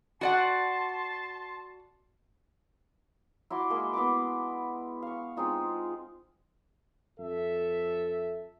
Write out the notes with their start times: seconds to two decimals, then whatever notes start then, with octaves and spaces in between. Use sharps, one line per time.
0.21 F#4 D5 F#5 A5 C6
3.50 E4 F#4 C6 D6
3.70 G#3 A#3 C6
3.93 B3 E4 C6 D6
5.02 F5 C#6
5.37 G#3 C4 D#4 F4
7.19 F2 A4 E5